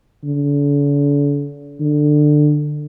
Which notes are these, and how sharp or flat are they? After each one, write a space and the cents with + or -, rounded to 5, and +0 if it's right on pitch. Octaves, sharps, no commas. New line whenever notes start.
D3 -40
D3 +20